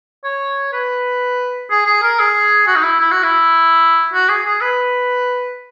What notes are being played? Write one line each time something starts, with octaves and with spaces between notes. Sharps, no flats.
C#5
B4
G#4
G#4
A#4
G#4
F#4
D#4
E4
E4
F#4
E4
F#4
G#4
G#4
B4